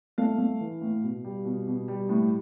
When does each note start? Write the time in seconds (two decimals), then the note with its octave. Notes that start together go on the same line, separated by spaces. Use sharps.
0.18 A3 F5
0.38 A3
0.60 E3
0.82 A2
1.04 B2
1.24 G3
1.45 B2
1.68 B2
1.88 G3
2.09 A2